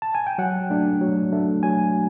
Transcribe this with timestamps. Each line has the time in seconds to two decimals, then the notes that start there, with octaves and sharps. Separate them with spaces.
0.02 A5
0.15 G#5
0.27 G5
0.38 F#3 F#5
0.70 A3 D4
1.01 F#3
1.32 A3 D4
1.63 F#3 G#5